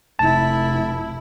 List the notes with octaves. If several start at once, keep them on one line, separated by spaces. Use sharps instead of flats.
F1 E4 A5